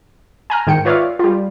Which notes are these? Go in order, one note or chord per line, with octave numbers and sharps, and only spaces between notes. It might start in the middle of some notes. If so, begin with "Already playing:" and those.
G#5 A#5 F6
G#2 D#3 G5 C#7
F4 B4 C#5 D5 E5 F5
G3 F4